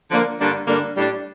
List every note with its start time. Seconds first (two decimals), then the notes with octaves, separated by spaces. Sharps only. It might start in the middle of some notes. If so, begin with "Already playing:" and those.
0.10 D3 F3 A#3 D4
0.38 G2 D3 G3 A#3 D4
0.67 G2 D3 G3 A#3 D4
0.96 A2 G3 D4